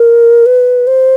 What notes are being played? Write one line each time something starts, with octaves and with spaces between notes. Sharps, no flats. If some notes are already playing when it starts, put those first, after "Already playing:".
Already playing: A#4
B4
C5